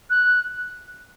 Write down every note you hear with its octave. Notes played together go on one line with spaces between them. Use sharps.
F#6